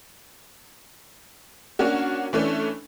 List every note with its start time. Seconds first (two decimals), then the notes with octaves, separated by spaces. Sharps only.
1.79 A#3 C#4 D4 F#4
2.33 E3 A3 C#4 D4